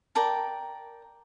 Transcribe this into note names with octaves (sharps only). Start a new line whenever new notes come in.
A#4 D5 G5 A5